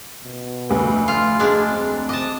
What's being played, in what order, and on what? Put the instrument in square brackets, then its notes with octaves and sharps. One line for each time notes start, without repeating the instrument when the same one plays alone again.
[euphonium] B2
[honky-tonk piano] F1 D2 B4
[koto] F4
[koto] G#3 D4 [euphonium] G#4
[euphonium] C4
[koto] D#5 A5 [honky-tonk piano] D6